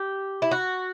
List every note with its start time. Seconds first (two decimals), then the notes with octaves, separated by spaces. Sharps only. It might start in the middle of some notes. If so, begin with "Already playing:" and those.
Already playing: G4
0.42 E4
0.51 F#4